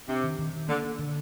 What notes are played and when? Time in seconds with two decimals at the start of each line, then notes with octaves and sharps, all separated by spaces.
0.08 C3 D4
0.24 D#3
0.39 D#3
0.53 D#3
0.68 D3 A#3
0.84 D4
0.99 D3